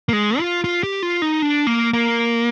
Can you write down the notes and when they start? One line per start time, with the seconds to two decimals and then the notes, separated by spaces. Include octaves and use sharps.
0.09 A#3
0.13 G#3
0.39 F4
0.64 F4
0.83 G4
1.03 F4
1.22 D#4
1.42 D4
1.67 A#3
1.93 A#3